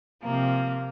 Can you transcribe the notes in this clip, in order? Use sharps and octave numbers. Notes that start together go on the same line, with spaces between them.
C3 F3 A#3